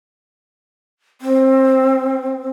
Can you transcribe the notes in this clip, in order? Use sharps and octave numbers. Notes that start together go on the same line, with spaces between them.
C4